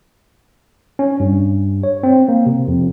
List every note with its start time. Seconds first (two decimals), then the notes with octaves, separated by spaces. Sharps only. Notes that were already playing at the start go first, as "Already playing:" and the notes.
0.99 C#4
1.20 G2
1.83 C#5
2.03 C4
2.28 A#3
2.46 C3
2.68 F2